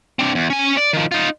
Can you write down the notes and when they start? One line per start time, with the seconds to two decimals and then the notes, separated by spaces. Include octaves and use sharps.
0.19 C4 D4
0.35 E2
0.50 C#4 G#5
0.77 D5
0.93 D#3 F3
1.12 D#4 F4